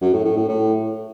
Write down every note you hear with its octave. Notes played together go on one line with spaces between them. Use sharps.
F#2
A2
A2
A2
A2